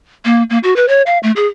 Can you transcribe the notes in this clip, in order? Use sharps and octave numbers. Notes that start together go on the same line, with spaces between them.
A#3
A#3
F#4
B4
C#5
F5
A3
G#4